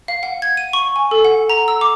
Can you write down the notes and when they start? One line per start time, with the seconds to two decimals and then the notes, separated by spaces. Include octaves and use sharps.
0.08 F5
0.23 F#5
0.42 G#6
0.57 D#7
0.73 C#6
0.96 G#5
1.11 A4
1.25 F#5
1.50 A#5
1.68 E6
1.81 D6